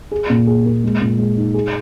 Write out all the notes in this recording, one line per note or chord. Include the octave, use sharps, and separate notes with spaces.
G#4
A#2
G#4
A#3
G#3
A#2
G#3
D#4
G#4